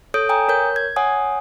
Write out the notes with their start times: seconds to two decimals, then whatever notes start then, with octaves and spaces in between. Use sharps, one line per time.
0.14 A4 C#5 D#6 G6 D7
0.29 G5 G#5 A#5 D#6
0.49 A#4 C#5 G6
0.76 G#6
0.96 C#5 F#5 G#5 D#6